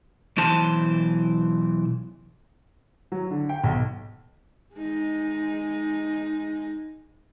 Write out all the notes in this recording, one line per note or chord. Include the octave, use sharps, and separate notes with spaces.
B1 E3 C5 A5
F#3
D3
G5
B1
G#3 D#4